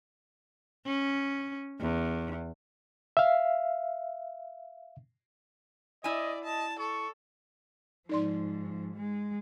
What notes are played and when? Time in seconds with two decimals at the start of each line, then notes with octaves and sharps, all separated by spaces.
0.86 C#4
1.80 E2
3.17 E5 F5
6.04 E4 D5 D#5 G#5
6.44 D#5 A5
6.80 A4 C#6
8.09 G#2 F3 D#4 D5 C6
8.96 G#3